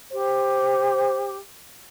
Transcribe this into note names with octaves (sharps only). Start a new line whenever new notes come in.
G4 C5